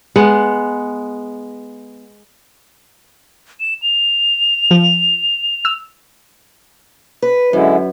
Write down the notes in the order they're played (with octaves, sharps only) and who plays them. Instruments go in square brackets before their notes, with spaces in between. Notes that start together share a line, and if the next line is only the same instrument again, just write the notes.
[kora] G#3 B3 F#5
[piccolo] E7
F7
[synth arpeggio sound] F3
E6
[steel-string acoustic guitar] B4
[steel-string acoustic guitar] F#2 [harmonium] D3 G#3 E4